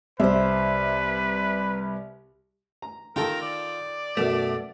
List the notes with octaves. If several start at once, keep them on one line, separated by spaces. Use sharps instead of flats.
C2 B4 C5 E5
A#5
D#3 F4 A4 A#4 G5 A5 A#5
D5
F#2 B2 A3